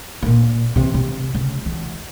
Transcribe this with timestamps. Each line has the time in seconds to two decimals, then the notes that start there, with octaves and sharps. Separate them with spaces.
0.22 A#2 A#3
0.76 C3 E3
0.94 C3
1.34 C#3
1.66 E2